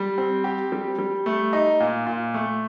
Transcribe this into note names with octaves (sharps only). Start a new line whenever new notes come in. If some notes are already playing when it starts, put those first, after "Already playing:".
Already playing: G3
C4
G4
G3
G3
A3
D#4
A#2
A#2
A3